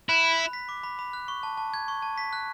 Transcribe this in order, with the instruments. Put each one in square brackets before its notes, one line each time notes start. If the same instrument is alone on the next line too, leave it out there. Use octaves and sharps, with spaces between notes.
[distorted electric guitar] E4 [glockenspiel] F#6
[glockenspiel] B5
B5
B6
D6
B5
B5
F#6
C#6
A5
A5
G#6
C#6
A5
B6
F#6